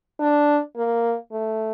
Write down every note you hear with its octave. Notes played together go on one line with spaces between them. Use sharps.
D4
A#3
A3